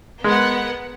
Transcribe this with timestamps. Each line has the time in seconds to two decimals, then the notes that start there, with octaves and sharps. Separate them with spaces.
0.24 G#3 B3 A#4 F#5